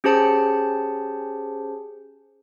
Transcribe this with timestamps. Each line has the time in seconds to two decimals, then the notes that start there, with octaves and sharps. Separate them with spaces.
0.04 C#4 G4 G#4 C5 A5 C#7